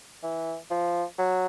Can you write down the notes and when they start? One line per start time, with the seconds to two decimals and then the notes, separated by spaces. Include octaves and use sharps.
0.23 E3
0.70 F3
1.19 F#3